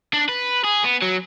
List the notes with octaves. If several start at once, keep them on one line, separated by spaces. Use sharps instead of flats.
D4
B4
G#4
B3
F#3